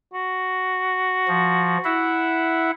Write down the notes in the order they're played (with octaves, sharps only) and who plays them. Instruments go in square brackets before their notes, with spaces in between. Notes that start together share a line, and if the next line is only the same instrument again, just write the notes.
[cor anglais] F#4
[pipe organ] F3
E4 E5 F#5